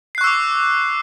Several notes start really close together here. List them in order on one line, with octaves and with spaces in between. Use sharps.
C7 F#6 C#6 E6 D6